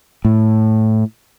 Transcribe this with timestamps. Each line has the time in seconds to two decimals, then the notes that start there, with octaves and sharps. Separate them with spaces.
0.25 A2